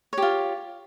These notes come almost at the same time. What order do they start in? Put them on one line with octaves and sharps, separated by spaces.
C#5 G4 F4